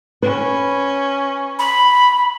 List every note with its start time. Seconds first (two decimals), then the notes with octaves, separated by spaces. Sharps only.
0.23 C#4 B4
1.59 B5